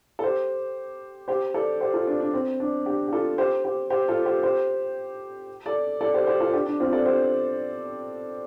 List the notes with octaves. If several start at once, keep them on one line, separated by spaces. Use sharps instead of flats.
A4
G4 C5
G4 C5
A4 D5
G4 C5
F4 A4
D4
D4
C4
D4
D4 G4
G4
F4 A4
G4 C5
G4 C5
G4 C5
F4 A4
G4 C5
G4 C5
A4 D5
A4 D5
G4 C5
G4 C5
F4 A4
D4 G4
D4
C4 F4
A4 D5
G4 C5